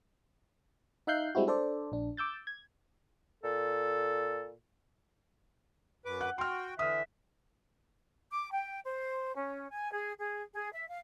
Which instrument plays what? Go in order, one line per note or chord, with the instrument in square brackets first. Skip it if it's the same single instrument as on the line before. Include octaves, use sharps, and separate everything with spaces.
[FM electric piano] D#4 E5 F5 F#6 G6 C7
G3 G#3 C4 E4 F#4
D4 A4 C5 D5
A#1 D4
D6 E6 G6 A6
G#6
[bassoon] A#2 [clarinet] A4
[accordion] F#2 B4 D6
[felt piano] F#5 F#6
[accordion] F#4 G5 [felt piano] C6 F6
[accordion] D3 E3 [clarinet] E5 [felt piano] D#6 F6
[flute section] D6
G5
C5
C#4
G#5
G#4
G#4
G#4
E5
F5